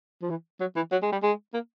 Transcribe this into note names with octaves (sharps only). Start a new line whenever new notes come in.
F3
E3
F#3
E3
F#3
G#3
G3
G#3
A#3